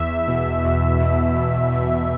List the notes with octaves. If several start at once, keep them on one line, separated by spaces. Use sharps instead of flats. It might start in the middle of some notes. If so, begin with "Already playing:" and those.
Already playing: E2 E5
B2
E2
B2
E2
B2